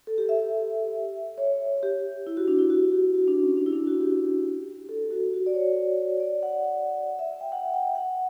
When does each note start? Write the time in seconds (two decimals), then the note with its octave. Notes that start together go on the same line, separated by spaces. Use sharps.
0.07 A4
0.18 G4
0.29 E5
0.39 E5
1.38 C#5
1.83 G4
2.27 E4
2.37 F#4
2.48 D4
2.59 E4
2.70 F#4
2.92 G4
3.14 F#4
3.28 D4
3.43 C#4
3.57 D4
3.66 E4
3.72 D4
3.87 F#4
4.01 G4
4.89 A4
5.11 F#4
5.33 F#4
5.46 D5
5.54 C#5
6.20 D5
6.43 F#5
7.19 E5
7.41 G5
7.52 F#5
7.74 G5
7.95 F#5